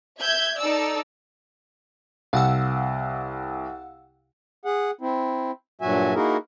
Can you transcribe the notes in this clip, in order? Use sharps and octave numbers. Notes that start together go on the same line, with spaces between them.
E5 G6 G#6
D#4 A4 D5 E6
C2 F5 F#5 E6
G#4 F#5
C4 E4
G2 A#2 F#3 F#4 E5 G#5
A#3 D#4 E4 F#4 G#4 A#4